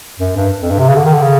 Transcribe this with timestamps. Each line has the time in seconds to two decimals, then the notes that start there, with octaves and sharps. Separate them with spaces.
0.19 F#2
0.36 G2
0.62 F2
0.71 G2
0.79 C3
0.88 C#3
0.96 D3
1.05 D#3
1.13 D3
1.22 C#3